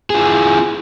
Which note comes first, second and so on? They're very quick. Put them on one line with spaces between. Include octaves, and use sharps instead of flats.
G#4 F4 E4